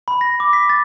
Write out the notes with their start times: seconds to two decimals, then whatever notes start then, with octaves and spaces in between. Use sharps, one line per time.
0.08 B5
0.21 A#6
0.40 D6
0.53 B6
0.70 A6